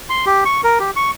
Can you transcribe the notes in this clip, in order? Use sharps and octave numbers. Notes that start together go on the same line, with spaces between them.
C6
G4
C#6
A#4
G4
C#6